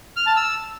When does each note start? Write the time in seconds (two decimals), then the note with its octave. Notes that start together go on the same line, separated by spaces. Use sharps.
0.16 F6
0.26 A5
0.36 E6